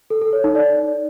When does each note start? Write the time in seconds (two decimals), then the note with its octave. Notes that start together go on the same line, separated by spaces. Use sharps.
0.10 A4
0.22 A4
0.33 C#5
0.44 D#4
0.55 D5